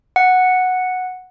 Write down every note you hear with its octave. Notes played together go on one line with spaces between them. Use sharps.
F#5